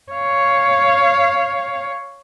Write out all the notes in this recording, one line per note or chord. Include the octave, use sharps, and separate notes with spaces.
C#5 F5